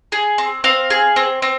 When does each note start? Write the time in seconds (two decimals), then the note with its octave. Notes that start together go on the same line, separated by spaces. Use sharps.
0.12 G#4
0.38 C4
0.64 C4 F5
0.90 G#4
1.16 C4
1.42 C4